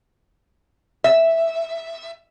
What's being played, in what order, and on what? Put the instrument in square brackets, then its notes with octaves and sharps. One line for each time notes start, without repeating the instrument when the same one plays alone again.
[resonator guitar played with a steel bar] E5